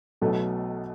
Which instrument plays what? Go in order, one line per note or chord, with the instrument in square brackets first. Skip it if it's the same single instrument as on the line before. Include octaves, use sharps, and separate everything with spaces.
[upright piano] B1 B2 F#3 A3